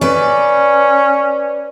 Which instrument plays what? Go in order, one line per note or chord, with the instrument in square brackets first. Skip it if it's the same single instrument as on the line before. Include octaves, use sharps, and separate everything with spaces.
[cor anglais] C#4 [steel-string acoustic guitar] B4 D5